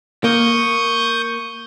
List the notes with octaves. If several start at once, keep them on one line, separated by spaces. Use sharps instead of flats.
A#3 C#6 D#6 G6